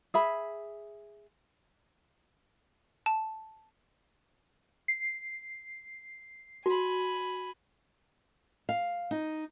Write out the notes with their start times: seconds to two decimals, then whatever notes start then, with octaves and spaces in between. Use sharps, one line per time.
0.14 G#4 E5 B5
3.06 A5
4.88 C7
6.66 F#4 G#5 B5
8.69 F5
9.11 D#4